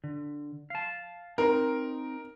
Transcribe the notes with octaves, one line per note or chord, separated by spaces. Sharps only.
D3
F5 A5
C4 D#4 A#4